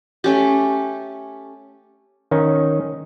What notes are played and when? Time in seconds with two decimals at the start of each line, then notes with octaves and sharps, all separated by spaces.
0.24 A3 C#4 G4
2.31 D#3 C#4 D#4